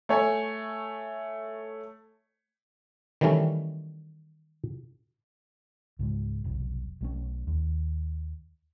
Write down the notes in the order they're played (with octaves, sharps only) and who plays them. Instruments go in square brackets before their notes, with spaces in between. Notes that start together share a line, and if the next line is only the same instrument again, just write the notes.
[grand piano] A3 C#5 G#5
[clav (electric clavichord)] D#3 E3 G3 A3 C#4
[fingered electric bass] C#2 G#2 F#3 G#3
F1 B1
B1 A3 C#4
D#2